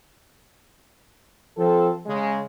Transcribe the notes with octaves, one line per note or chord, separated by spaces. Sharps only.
F3 C4 A4
C#3 G#3